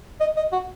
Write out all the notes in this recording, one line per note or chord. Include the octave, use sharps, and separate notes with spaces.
D#5
D#5
F#4